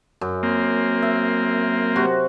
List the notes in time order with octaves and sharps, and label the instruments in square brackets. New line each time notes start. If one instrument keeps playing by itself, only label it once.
[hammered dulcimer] F#2
[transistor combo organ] A#3 C4
[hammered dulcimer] E5
C3 F#4